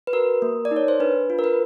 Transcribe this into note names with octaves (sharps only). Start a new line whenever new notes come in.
B4
F#4 A#4
A#3
D5
D#4
C#5
C5
D4 B4
F4
A#4
B4